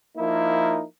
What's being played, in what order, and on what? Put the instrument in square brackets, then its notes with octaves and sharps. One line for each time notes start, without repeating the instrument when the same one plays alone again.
[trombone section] F3 A#3 D#4 E4 A#4